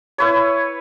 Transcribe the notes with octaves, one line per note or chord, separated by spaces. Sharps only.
E4 B4 C#5